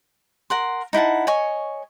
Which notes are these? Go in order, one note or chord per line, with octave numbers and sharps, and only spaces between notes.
A#4 F#5 C6
D#4 E4 F#5 A5
C#5 D#5 G#5 C#6